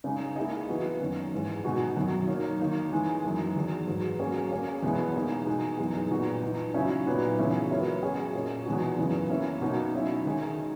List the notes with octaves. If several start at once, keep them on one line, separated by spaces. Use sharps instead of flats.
C#3 G#3 D#4
A#3 E4 G#4 D#5
E3 B3 F#4 B4
F#2 D#3 A#3 C#4
G#2 E3 G#3
B2 G#3 D#4 F#4
F#2 D#3 F#3
F#3 A#3 D#4 A#4 C#5
D#3 A#3 D#4
E3 G#3 D#4
F#2 E3 A#3
E2 D#3 F#3
G#2 F#3 B3
F#3 A#3 C#4 G#4
A#3 C#4 G#4 C#5
E2 B2 G#3 B3 E4
E3 A#3 D#4 G#4
B2 G#3 D#4
F#2 E3 B3 D#4 G#4
A#2 F#3 B3 D#4 F#4
E3 B3 D#4
C#3 F#3 C#4 E4
A#2 F#3 B3 D#4
E2 C#3 G#3 C#4 E4
F#3 B3 E4 A#4 C#5
F#3 C#4 G#4 D#5
A#2 A#3 C#4
E2 B2 G#3 D#4 F#4
F#2 C#3 E3 B3
A#3 C#4 E4
B2 A#3 D#4 F#4
F#3 C#4 E4
D#3 G#3 D#4 G#4 D#5